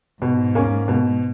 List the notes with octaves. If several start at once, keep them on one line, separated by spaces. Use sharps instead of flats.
G#2 B2
A#3 C#4
B2